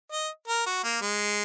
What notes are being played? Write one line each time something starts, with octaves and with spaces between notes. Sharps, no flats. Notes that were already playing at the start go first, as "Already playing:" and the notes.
D#5
A#4
F#4
A#3
G#3